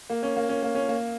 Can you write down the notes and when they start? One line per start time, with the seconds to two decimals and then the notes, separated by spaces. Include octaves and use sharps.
0.10 A#3
0.23 C#4
0.36 A#3
0.49 C#4
0.63 A#3
0.75 C#4
0.89 A#3